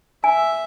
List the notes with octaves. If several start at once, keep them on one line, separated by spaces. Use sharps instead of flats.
E5 G#5